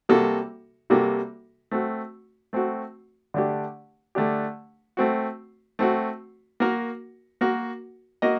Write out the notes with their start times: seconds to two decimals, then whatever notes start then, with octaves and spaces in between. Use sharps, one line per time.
0.09 C3 G3 A#3 F#4 A4
0.90 C3 G3 A#3 F#4 A4
1.71 A3 C4 F#4
2.53 A3 C4 F#4
3.34 D3 A3 D4 G4
4.15 D3 A3 D4 G4
4.97 A3 C4 F#4
5.79 A3 C4 F#4
6.60 A#3 F#4 A#4
7.41 A#3 F#4 A#4
8.22 A#3 F#4 A#4 D#5